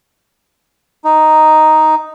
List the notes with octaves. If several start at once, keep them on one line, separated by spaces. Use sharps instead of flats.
D#4